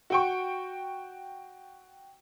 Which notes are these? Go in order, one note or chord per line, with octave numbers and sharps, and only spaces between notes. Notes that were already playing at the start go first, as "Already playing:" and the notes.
F#4 G5 C#6